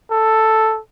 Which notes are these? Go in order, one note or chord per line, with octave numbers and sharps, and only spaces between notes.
A4